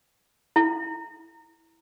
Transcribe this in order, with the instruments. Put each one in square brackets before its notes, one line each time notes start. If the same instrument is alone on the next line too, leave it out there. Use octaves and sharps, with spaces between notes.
[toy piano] E4